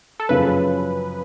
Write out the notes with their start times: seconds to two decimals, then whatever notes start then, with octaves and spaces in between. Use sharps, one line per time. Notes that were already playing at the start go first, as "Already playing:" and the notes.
0.20 A4
0.29 F#2 C#3 F3 B4